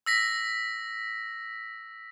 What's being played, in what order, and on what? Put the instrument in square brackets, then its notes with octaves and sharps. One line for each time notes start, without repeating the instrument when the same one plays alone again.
[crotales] E6 A#6 B6